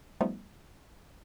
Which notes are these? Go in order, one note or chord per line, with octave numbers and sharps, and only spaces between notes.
F3 G3 A3 B3 D#4 F4